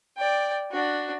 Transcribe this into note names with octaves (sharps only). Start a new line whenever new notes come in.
D5 G5
D4 F#4